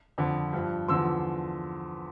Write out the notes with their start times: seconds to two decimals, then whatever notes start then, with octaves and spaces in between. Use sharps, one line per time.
0.18 F2 D3 F3
0.53 G2 F3
0.88 E2 D3 F3 C6 E6